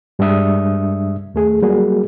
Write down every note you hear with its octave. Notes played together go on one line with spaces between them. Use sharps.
G2 G3 G#3 D4 E5 D#6
D#2 A3 G#4
F#3 G3 A#3 F#4 G#4